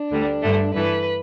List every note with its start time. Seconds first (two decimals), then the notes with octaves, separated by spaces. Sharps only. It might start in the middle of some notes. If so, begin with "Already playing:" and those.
Already playing: D4
0.11 D2 D3 G3
0.42 G2 D3 A3
0.73 G2 E3 A3 B4